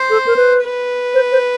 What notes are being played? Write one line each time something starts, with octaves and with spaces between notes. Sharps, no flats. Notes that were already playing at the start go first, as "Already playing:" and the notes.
Already playing: C5
A4
A#4
B4
B4
C5
C5